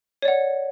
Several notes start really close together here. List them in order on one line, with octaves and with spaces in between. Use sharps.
C#5 D5 F#5